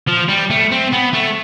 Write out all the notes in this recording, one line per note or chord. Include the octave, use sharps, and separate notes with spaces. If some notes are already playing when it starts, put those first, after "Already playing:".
F3
G3
A3
C4
B3
A3